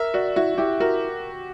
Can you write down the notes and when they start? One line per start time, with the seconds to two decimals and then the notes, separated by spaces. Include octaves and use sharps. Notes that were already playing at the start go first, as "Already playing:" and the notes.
Already playing: A#4 E5
0.14 F#4 D5
0.36 E4 F#4
0.58 E4 G4
0.80 F#4 A#4